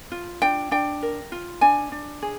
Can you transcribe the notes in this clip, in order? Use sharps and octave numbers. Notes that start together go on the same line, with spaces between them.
F4
D4 G5
D4 G5
A#4
F4
D4 G#5
D4
G#4